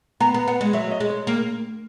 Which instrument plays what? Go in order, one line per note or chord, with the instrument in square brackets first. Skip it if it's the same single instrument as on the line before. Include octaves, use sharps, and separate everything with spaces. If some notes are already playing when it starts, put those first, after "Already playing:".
[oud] B3 [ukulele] A#5
[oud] B3
[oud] B3 [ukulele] F#5
[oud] G#3
[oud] F#3 [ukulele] E5
[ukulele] D#5
[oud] G#3
[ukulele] C#5
[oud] A#3